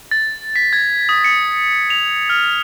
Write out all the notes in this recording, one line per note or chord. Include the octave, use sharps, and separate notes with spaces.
A6
B6
G#6
D#6
C#7
F7
F6